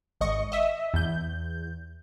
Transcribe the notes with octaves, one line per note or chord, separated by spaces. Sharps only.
G#1 D#5 C#6
D#5 E5
E2 G6